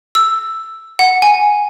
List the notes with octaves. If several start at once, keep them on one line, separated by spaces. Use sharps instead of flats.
E6
F#5
G#5